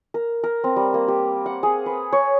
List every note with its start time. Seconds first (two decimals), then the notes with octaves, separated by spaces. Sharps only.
0.14 A#4
0.44 A#4
0.64 C4
0.76 G3
0.94 A#3
1.08 G4
1.46 F#5
1.63 G#4
1.86 B4
2.13 C#5